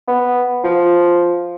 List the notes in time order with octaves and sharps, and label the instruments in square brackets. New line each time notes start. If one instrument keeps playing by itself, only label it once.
[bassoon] B3
F3